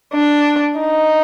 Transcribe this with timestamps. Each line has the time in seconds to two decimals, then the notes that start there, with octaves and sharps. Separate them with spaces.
0.14 D4
0.79 D#4